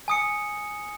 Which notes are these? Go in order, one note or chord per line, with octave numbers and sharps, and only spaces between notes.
G#5 D#6 C#7